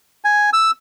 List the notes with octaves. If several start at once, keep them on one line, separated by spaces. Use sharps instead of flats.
G#5
E6